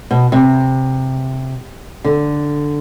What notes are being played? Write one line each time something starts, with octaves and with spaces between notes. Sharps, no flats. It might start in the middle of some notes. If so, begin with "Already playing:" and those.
B2
C3
D3